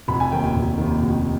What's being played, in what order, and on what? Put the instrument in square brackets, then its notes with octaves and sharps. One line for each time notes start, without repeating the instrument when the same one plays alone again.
[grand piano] F1 B5
G#5
D#2 D#3 G5
G5
F1
D#2 D#3
F1